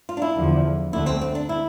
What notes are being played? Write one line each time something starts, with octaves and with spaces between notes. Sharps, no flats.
F4
D4
E4
E2 D3 F3
D2 D3 A3 E4
C4
C4
D4
E4